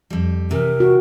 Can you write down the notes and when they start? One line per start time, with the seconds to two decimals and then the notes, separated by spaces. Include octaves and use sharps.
0.10 F2 G3
0.51 C3 E3 A#4
0.80 F#4